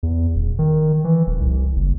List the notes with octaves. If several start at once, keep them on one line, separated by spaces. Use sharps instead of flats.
E2
D#1
D#3
E3
D#1
C2
F#1